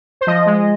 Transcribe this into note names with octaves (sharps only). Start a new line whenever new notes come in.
C5
F3 D#5
G#3